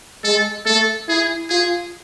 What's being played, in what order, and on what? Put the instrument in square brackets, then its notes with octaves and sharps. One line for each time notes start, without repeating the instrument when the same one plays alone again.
[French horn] G#3 [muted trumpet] A4
[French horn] A3 [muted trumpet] A4
[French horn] E4 [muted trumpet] G#4
[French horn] F4 [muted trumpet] G#4